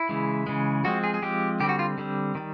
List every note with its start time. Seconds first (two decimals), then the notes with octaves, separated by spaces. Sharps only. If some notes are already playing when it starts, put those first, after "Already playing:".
Already playing: E4
0.09 C#3 E3 G#3
0.47 C#3 E3 G#3
0.85 F3 G#3 C4 F#4
1.04 G#4
1.14 G#4
1.22 F3 G#3 C4 G4
1.60 D3 G3 C4 G4
1.69 F#4
1.79 F4
1.98 D3 G3 C4
2.35 D#3 G3